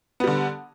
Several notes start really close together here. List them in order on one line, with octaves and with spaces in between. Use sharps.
B3 G3 D3